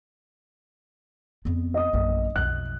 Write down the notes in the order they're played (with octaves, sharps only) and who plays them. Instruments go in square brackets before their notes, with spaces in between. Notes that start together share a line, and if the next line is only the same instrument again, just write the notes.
[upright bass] F2 B3
[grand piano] D#5 D#6
[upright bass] A#1 F#2
[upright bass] B1 F2 [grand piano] F#6